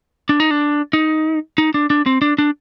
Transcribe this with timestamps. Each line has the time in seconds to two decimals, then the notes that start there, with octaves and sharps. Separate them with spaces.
0.29 D4
0.40 D#4
0.51 D4
0.93 D#4
1.58 D#4
1.74 D4
1.90 D4
2.06 C4
2.22 D4
2.38 D4